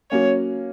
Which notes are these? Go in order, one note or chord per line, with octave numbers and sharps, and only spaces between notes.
F#3 A#3 C#4 C#5